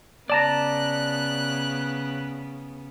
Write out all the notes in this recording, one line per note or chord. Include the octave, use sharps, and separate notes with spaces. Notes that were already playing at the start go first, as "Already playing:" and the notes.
C#3 B3 D5 A5 A#5 F#6